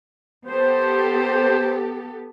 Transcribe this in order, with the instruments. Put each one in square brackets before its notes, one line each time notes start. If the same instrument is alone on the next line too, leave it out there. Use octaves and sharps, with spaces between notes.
[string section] B3 G4 A4 [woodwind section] C5